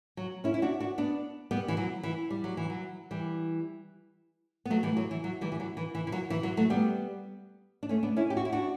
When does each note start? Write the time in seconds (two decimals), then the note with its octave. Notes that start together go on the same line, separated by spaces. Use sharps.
0.17 F#3
0.44 C#4 E4
0.54 E4
0.62 D4 F#4
0.80 D4 F#4
0.98 B3 D4
1.51 G3 B3
1.68 E3
1.77 F#3
2.03 E3
2.30 G3
2.44 F#3
2.57 E3
2.70 F#3
3.11 E3 G3
4.65 B3
4.70 F#3 A3
4.83 E3 G3
4.97 F#3
5.11 E3
5.24 F#3
5.41 E3 G3
5.52 E3
5.60 F#3
5.77 E3
5.95 E3
6.07 E3
6.12 F#3
6.30 E3
6.43 F#3
6.57 F#3 A3
6.70 G3 B3
7.83 D4
7.89 A3 C#4
8.03 B3 D4
8.16 C#4 E4
8.30 G4
8.37 F#4
8.45 E4
8.52 D4 F#4